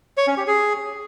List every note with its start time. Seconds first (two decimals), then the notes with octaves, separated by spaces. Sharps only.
0.17 C#5
0.27 C#4
0.37 G4
0.47 G#4